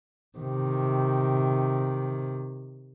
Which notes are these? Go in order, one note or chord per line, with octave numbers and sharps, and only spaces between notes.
C3 D#3